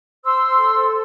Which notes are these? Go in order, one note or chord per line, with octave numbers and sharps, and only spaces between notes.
C5 C6 E6
A4